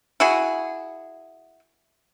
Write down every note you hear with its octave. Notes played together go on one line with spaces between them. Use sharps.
E4 F#4 G#4